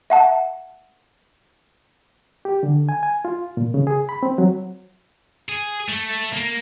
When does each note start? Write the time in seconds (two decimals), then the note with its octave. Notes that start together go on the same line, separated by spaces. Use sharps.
0.10 E5 F#5 A5
2.45 G4
2.63 D3
2.89 G#5
3.03 G#5
3.25 F4
3.57 A#2
3.74 C#3
3.87 G#4
4.09 B5
4.23 C4
4.38 F#3
5.49 G#4
5.89 A3
6.33 A#3